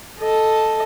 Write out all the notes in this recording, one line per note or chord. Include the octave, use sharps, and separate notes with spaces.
A4 D#5 A5